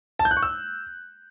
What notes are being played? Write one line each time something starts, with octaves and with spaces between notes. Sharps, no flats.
A5
G6
F#6
C#6
E6